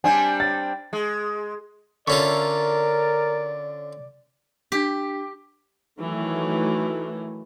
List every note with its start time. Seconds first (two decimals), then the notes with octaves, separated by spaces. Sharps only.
0.04 G3 C4 D4 G#5
0.40 A6
0.93 G#3
2.08 D3 C#4 F4 A4 A#4 D5 E5 C#6
4.72 D4 G4 B6
6.00 D#3 E3 F#3 A3